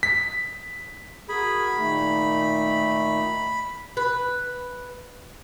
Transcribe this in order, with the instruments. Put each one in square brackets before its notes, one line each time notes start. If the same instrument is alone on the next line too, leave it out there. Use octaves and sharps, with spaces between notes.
[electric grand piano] B6
[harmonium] F#4 A#4 [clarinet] G#4 [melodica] B5
[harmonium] A#2 D#3 D#4 [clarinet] A3
[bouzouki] B4